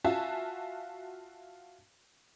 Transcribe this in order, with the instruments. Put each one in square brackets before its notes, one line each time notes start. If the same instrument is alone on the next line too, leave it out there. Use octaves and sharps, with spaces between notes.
[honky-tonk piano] F4 F#4 E5 G#5 A5